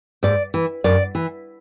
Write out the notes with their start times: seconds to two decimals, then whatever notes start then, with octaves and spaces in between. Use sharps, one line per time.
0.23 G#2 D5
0.54 E3
0.84 F#2 D5
1.15 E3